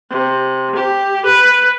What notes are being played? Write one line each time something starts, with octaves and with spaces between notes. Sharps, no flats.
C3
G4
B4